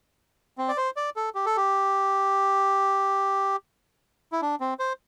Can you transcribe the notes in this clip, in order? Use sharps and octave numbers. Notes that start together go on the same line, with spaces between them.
C4
D5
C5
D5
A4
G4
A4
G4
E4
D4
C4
C5